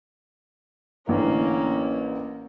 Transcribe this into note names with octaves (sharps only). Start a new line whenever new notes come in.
A1 D3 A#3 C#4